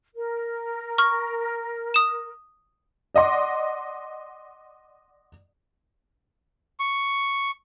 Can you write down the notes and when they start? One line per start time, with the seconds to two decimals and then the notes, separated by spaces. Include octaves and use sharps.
0.16 A#4
0.98 C#6 F6
1.94 D#6 E7
3.15 D5 D#5 F#5 C6 D6
6.80 C#6